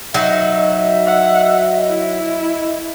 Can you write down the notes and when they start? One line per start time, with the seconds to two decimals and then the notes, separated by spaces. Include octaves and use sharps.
0.14 F#3 D#4 D#5 E5
1.06 F#5
1.87 E4